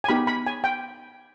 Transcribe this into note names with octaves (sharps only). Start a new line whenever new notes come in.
G#5
B3 D#4 G4 B5
B5
G#5
G5